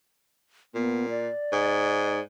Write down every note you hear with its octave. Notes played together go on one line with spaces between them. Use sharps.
A#2 B3
D5
G#2